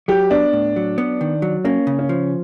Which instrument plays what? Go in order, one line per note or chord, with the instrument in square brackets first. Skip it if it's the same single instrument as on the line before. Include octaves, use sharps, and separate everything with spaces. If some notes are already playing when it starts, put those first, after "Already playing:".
[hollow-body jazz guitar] F#3 [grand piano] G4
[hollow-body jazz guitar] B3 [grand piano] D4
[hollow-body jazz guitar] A2
F#3
B3
D#3
F#3
[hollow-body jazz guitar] A#3 [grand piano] C#4
[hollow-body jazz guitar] C#3
[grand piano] C#4
[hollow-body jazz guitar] F3